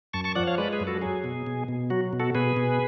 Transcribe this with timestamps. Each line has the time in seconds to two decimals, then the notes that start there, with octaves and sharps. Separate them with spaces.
0.13 F#2 A5 C#6
0.24 A5 C#6
0.35 F3 D5 F#5
0.47 C#5 F5
0.58 G#3 B4 D5
0.73 G#4 B4
0.80 F#2
0.87 F#4 A4
1.02 F#3 G#4
1.24 B2
1.47 B2
1.68 B2
1.90 F#3 F#4
2.13 B2
2.20 F#4 A4
2.35 B2 G#4 B4
2.57 B2